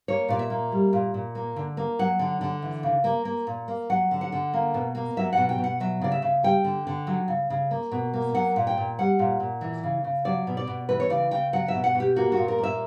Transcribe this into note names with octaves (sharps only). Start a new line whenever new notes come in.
A#3 C#5
A#2 D5
E5
A#3
G3
A#2
A#2
A#3
D3
A#3
F#3 F#5
D3
D3
E3
C#3
A#3
A#3
A#2
A#3
F#3 F#5
D3
F#5
D3
A#3
B2
A#3
F#3 E5
B2 F#5
G5
B2
F#5
F#3 E5
C#3 D5
E5
C#3
G3 G5
D3
D3
F#3
C#3
C#3
A#3
B2
A#3
F#3 F#5
A#2
G5
A#2
G3 F#5
A#2
A#2
E3
C#3
C#3
F#3 D5
B2
D5
B2
E3 B4
C#5
C#3 D5
C#3 G5
F#3 F#5
E5
B2
F#5
B2
G4
A#3 F#4
F#4
A#2
A#4
A#3
E5